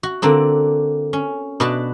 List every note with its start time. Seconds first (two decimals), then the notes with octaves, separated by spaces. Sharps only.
0.03 F#4
0.22 D3 A#3 C4 D4
1.13 C#4
1.60 B2 D4 F#4 B4 A5